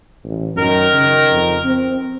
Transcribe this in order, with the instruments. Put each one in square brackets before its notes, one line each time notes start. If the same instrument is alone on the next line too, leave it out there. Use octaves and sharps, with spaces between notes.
[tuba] A1
[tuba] F#2 [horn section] D#3 A#4
[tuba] C#3
F2
C4